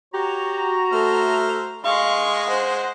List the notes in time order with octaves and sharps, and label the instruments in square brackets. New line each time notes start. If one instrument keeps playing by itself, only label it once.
[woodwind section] F#4 A#5 [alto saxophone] G4 [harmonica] C#5
[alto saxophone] A3 [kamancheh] A4 [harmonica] C5 E5 F6
[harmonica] G#3 G#4 D#5 [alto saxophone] F5 [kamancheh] C6 C#6
[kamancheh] C5 F#5